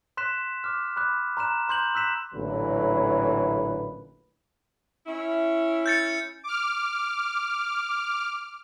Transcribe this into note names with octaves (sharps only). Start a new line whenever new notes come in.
C6 F#6 B6 E7
D6 F6
B5 D6 F#6
A#5 C6 F#6 E7
A#5 C6 G6 F#7
E6 F#6 B6 E7
A1 A#2 D3 E3 F#3 B4
C#4 E4
G6 A6 C#7
D6 F6